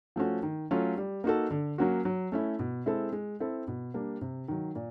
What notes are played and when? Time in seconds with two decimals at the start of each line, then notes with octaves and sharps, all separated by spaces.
0.16 F3 A3 C#4 F#4
0.43 D#3
0.71 F#3 A3 C#4 F4
0.98 G3
1.24 A#3 D#4 F#4 A4
1.51 D3
1.78 F#3 A#3 C#4 F#4
2.05 F#3
2.32 A3 C#4 E4
2.59 B2
2.86 G#3 C4 E4 A4
3.13 G#3
3.40 C4 E4 A4
3.68 B2
3.94 G3 A#3 D4
4.21 C3
4.48 D#3 F#3
4.76 A#2